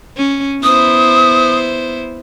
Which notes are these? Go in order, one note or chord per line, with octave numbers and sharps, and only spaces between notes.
C#4
B3 E4 C5 D#6